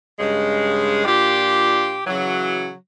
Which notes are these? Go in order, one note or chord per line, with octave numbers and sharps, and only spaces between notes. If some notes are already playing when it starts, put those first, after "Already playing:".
G2 C#3 G#3
A#2 D4 F4 G4
C#3 E3 F#3